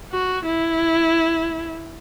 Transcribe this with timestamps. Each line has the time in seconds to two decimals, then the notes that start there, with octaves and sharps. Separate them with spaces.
0.12 F#4
0.46 E4